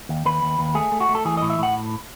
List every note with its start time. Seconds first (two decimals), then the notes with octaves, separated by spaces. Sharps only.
0.09 D#2
0.25 D#2 B4
0.42 D#2
0.59 D#2
0.75 A3 G#4
0.92 A3
1.00 F#4
1.09 A3
1.15 A4
1.25 E3 G#4
1.37 A2 D#5
1.50 E5
1.59 A2 F#5